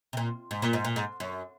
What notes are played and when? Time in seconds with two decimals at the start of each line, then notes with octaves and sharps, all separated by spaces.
0.13 C3
0.17 A#2
0.51 G#2
0.62 A#2
0.73 G#2
0.85 A#2
0.96 G#2
1.20 F#2